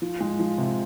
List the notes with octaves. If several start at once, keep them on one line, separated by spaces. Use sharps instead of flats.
F3
G#3
F3
C3